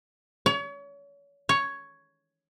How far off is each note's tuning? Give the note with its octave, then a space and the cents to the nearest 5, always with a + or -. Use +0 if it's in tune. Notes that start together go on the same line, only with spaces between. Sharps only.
C#5 +35
C#5 +5